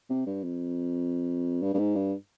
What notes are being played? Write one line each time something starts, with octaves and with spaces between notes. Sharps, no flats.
C3
G2
F2
G2
G2
G#2
G2